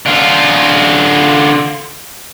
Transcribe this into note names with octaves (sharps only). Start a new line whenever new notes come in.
D3 F4